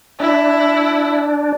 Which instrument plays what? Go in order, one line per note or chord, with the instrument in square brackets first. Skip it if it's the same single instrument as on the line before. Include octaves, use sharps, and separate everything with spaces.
[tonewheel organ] D4 [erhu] E4